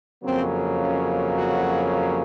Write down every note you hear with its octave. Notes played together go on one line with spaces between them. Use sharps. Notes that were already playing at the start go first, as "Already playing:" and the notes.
F2 C#3 F#3 A#3 C4
C#4
F#4